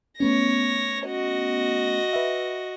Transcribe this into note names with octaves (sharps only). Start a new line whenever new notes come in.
A3 B3 C#4 C#5 A#6
F#4 D#5
B4 E5